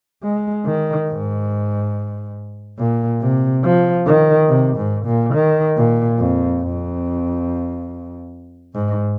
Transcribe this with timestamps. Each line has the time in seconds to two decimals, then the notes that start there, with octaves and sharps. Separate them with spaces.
0.23 G#3
0.65 D#3
1.09 G#2
2.78 A#2
3.21 C3
3.64 F3
4.06 D#3
4.49 C3
4.77 G#2
5.06 A#2
5.34 D#3
5.76 A#2
6.19 F2
6.62 F2
8.74 G#2